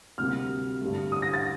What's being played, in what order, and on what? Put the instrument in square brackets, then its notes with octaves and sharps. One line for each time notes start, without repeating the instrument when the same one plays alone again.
[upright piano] D2 C3 G3 A#3 F6
G2 D3 A3
D#6
A#6
A6